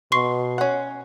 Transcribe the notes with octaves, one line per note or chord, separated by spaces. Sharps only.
B2 C6 C#6 C7
C#4 F#5